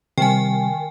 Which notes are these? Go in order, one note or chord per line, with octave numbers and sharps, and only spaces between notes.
C3 D#3 G3 G5 G#5